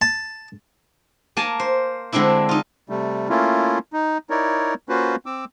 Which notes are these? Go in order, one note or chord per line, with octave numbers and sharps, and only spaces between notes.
A5
A#3 G#5 A5
C5
D3 G#3 C4 D4 E4
D#4 F4
C3 G3 A3
A3 A#3 C#4 E4 F4
D#4
D#4 E4 A#4 C#5 D5
A#3 C#4 F4 F#4 B4 C5
C4 D6 E6